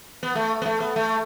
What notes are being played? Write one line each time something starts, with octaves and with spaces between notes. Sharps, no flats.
B3
A3
B3
A3
B3
A3